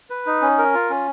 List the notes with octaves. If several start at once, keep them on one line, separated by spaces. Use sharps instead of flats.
B4
D#4
C#4
A#4
F4
C#4